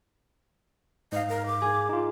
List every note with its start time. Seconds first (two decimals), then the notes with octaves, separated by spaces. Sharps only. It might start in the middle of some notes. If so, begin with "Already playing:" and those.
1.12 G#2 D#5 F5
1.29 A#4
1.47 D6
1.62 G#4
1.89 D#4 F4